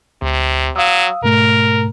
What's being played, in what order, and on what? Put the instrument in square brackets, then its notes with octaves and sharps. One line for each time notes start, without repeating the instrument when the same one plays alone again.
[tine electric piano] D2 [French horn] C3
[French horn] F#3 [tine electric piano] F5 D#6 E6
[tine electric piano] G#2 B2 A3 [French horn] A#4